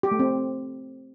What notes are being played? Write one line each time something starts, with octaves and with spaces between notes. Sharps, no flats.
G4
A3
C4